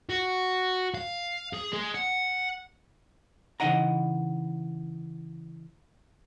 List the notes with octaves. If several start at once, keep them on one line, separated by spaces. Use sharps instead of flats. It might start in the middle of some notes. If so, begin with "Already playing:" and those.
F#4
F5
G#4
G#3
F#5
C#3 E3 D#4 D#5 F#5 A#5